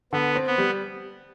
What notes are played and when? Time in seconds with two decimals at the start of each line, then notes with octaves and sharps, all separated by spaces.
0.13 D3 B3
0.35 C4
0.47 B3
0.58 G3